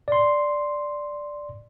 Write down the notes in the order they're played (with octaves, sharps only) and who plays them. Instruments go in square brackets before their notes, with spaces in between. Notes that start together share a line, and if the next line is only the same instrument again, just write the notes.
[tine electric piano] D5 C6